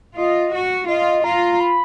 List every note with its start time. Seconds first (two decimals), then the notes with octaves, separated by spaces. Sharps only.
0.16 F4 D#5
0.52 F#4
0.87 F4 D#5
1.24 F4 A#5
1.60 B5